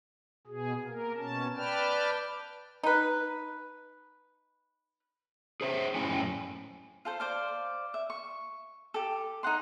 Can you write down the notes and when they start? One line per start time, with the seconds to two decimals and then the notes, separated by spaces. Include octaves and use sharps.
0.47 B2 G#4
0.87 A#3 A#4
1.16 B2 C#4 A5
1.56 B4 D5 G5 A5 F6
2.83 D#4 B4
5.61 G#4 C5 E5
5.95 F#2 A2 C#4 E4 G5 G#5
7.05 F4 A4 C5
7.20 C5 D5 F5
7.94 E5
8.10 C#6
8.94 G4 A4
9.43 D#4 F#4 F#5 C6